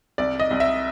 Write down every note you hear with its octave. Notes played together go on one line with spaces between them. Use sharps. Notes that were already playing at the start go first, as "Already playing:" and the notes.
C2 D5
D#5
C2
E5